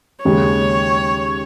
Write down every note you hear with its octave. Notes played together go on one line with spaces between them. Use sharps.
D#2 C#3 G#3 C#5